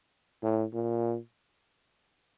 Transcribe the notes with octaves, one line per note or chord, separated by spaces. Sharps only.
A2
A#2